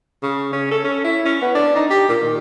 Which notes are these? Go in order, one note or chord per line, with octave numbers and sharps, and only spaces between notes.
C#3
C#4
A4
C#4
E4
C#4
B3
D4
D#4
G4
A#2
D#3